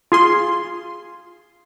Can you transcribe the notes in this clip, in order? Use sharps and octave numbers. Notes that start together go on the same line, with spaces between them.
F4 G#4 C6